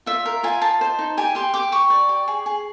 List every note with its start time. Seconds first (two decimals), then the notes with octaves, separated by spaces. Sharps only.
0.06 F4 E5
0.26 A#4
0.43 F4 G#5
0.62 D#5 A5
0.81 C5
0.99 D#4
1.17 G4 G#5
1.35 G4 C6
1.54 G4 D6
1.72 G4 C#6
1.90 D5
2.09 G4
2.28 G#4
2.46 G#4